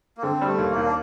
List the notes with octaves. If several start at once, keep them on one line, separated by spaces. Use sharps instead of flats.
A#3
D3 C4
G3
A3
D#2
A#3
D#2
D4